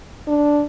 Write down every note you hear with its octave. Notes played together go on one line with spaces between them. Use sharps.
D4